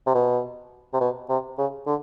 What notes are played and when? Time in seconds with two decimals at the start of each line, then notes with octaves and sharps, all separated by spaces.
0.06 C3
0.14 B2
0.93 C3
1.00 B2
1.29 C3
1.58 C#3
1.86 D3